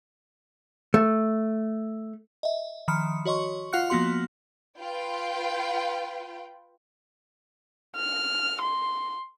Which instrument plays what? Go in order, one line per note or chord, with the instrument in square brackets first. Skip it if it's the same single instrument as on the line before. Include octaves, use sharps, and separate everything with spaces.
[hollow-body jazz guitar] A3
[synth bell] D#5 E5
D#3 F3 B5 F6 C#7
F#4 C#5 D#5 C6 C#6
F4 F5 F#5 F6 F#6 C#7
F3 A#3 B3 F#4 C6
[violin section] F4 B4 G5
[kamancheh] F6
C6